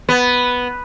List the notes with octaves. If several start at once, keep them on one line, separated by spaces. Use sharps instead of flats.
B3